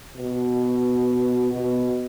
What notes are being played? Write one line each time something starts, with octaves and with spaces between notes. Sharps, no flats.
B2
B2